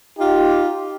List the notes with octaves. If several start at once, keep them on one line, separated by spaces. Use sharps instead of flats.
D#4 F4 G4